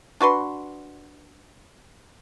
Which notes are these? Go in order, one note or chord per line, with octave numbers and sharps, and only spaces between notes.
D4 F#4 B4 C6